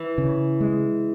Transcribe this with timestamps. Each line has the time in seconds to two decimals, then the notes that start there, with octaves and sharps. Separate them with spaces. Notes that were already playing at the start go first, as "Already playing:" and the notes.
Already playing: E3
0.18 C#3
0.60 G#3